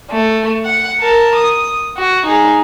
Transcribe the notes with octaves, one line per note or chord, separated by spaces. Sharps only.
A3
F#5
A#4 A5
D#6
F#4
D#4 G#4